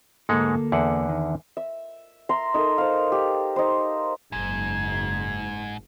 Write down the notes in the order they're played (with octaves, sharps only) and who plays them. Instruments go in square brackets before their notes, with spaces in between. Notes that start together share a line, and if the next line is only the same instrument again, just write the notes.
[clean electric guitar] D2 A#3 A4 [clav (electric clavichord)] G#2 G#3 F#5
[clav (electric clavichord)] E2 D3 F#5
[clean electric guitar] D#3
[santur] E5
E5 A#5 C6
D#4 A4 A#4
C5 F5
G4
D#4 C5
[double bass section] F#1 [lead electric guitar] G#2 [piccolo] G#6